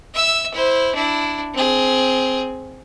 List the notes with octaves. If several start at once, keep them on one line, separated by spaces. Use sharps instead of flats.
E5 E6
E4 C5
D4 E4
C4 G#4